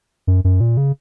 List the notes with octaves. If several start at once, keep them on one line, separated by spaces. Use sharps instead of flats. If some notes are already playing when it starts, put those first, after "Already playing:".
F#2
F#2
A#2
C#3